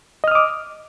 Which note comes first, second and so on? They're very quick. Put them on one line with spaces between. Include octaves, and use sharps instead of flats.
D#5 F6 D#6 D6